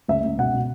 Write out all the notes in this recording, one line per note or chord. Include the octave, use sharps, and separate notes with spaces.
C#2 E5
C#2
B2 F#5
B2